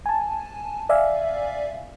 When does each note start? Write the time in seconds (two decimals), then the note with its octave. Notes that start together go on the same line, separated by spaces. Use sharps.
0.06 G#5 A5
0.89 D5 E5 F5 G#5